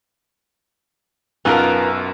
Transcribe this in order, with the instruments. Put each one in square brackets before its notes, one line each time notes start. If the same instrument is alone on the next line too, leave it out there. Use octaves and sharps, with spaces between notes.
[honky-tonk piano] B1 F#2 [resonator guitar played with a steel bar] B3 F4 A#4